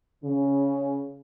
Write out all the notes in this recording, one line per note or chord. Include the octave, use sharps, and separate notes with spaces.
C#3